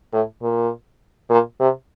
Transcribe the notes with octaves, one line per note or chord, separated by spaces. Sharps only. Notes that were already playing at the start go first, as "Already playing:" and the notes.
A2
A#2
A#2
C3